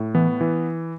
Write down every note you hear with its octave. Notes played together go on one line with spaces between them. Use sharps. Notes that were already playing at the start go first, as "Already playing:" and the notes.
Already playing: A2
E3 B3
E3